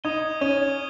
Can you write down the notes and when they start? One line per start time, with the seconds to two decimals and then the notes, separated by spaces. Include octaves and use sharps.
0.04 D#4 D#6 G#6 D#7 G7
0.40 C#4 D#6 G#6 D#7 G7